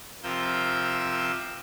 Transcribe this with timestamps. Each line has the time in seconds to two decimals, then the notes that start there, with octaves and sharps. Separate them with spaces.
0.23 C3 F3 F4 A#4 E6 G6